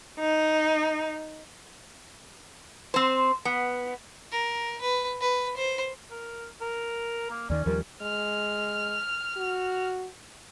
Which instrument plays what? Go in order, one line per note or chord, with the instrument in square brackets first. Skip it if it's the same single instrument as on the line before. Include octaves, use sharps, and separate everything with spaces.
[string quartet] D#4
[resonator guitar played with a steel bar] C4 C5
B3
[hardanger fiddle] A#4
B4
B4
C5
[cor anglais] A#4
A#4
A#3
[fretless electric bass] D#2 D#3 [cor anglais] C#4 [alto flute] D5
[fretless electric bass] D#2 F3 G3 [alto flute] A#4
[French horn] G#3 [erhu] F6
[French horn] F#4